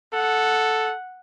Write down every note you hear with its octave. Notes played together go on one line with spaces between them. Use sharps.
A4 F#5